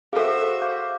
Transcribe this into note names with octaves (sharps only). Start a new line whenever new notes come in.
F#4 G#4 A4 C5 E5 F5
F5 D6 G6